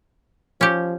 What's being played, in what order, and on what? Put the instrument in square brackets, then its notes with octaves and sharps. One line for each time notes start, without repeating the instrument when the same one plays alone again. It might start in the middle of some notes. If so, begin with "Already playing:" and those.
[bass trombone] F3 [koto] C#4 G4